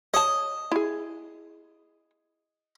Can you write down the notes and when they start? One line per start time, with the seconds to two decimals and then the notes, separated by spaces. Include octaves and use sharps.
0.14 C#5 D#5 A5
0.72 E4 G#4